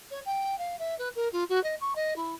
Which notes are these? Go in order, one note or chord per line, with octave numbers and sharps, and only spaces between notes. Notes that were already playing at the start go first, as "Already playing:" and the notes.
C#5
G5
F5
E5
B4
A#4
F4
F#4
D#5
C#6
D#5
E4